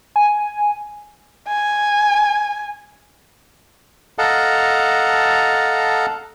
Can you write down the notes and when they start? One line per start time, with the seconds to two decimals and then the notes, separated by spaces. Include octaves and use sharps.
0.16 G#5
1.48 G#5
4.18 A4 D#5 F5 F#5 A5 A#5